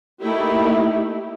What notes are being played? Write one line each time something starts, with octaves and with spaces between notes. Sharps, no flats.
A3 A#3 D#4 E4 G4